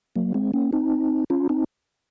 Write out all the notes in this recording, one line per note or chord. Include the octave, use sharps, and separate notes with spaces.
F#3 A#3
G#3 C4
A#3 C#4
C4 D#4
C#4 F4
C4 D#4